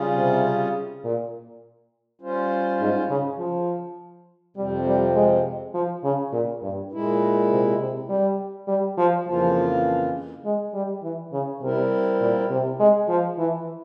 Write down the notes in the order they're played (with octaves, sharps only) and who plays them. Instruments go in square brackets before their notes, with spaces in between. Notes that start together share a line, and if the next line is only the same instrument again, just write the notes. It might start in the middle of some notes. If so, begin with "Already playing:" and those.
Already playing: [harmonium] C#3 G3 C#4 F4 G#4
[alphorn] C3
A#2
[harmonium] G3 C#4 F4 C5
[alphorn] G#2
C#3
F3
[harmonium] F2 C3 F3 C4 [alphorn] G3
[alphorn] G3
G#3
F3
C#3
A#2
G2
[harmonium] A#2 G#3 E4
[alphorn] C3
C3
G3
G3
F3
[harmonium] F2 C#3 E3 A#3 F4 [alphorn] F3
[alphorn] G#3
G3
E3
C#3
[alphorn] C3 [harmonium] G3 C4 E4 A#4
[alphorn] A#2
C3
G#3
F3
E3